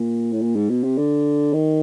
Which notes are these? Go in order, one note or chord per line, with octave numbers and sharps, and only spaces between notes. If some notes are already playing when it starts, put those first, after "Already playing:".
Already playing: A#2
A2
A#2
G#2
B2
C3
D3
D#3